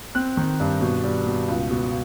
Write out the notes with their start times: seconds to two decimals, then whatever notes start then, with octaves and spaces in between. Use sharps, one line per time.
0.15 C4 F#6
0.37 D#3
0.60 G2
0.81 B2
1.04 G3
1.26 B2
1.48 C#2
1.71 B2